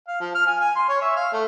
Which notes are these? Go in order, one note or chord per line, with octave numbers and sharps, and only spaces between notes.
F5
F3
F6
G#5
G#5
C6
C#5
E5
F5
A3